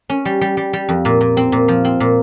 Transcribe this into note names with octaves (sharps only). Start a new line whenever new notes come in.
C#4
G3
G3
G3
G3
F2
A#2
A#2
C4
A#2
F3
C4
A#2